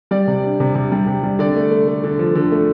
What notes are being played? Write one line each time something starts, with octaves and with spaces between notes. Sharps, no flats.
G3 D5
C3
D4
C3
C3
G3
C3
G3
D3 D5
A3
A3
A3
D3
F3
D3
A3